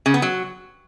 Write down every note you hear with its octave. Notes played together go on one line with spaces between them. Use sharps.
C#3
B3
F#3